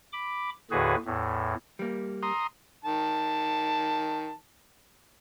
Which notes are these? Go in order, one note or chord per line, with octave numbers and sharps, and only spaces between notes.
B5 D6
D#2 A2 D3 F#4 G#4 B4
E2 A2
G3 A#3
A#5 C6 D#6
D#3 A5